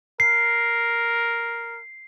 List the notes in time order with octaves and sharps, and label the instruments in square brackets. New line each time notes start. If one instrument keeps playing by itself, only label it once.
[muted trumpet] A#4 [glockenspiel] C7